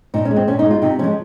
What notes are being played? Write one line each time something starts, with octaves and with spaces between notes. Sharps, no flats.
A#2 D#4
C#4
G#3
C4
A#2 C#4
D#4
G#3
F4
C3 D#4
F3 G#3 C#4